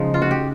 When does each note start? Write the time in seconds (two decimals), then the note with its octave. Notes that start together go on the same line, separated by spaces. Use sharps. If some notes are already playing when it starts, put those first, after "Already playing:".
Already playing: C#3 F3 G#3 D#4
0.14 F4
0.22 F#4
0.31 G4